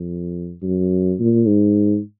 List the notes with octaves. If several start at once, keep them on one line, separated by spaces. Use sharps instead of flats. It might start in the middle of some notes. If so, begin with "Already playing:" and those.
Already playing: F2
F#2
A#2
G#2